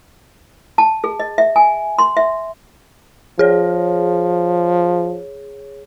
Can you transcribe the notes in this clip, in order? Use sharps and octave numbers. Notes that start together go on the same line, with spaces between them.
A5
G#4
D#5
E5
G#5
C6
E5
F3 G#4 C#5